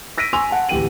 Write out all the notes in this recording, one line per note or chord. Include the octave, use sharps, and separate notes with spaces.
E6 A#6 B6 D7 D#7
G#5 C6 C#6 E6 F7
F#5 A5
D1 E3 G4 G5 D#7 F#7